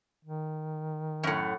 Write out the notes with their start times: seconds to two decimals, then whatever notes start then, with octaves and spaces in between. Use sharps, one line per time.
0.25 D#3
1.23 F#2 A2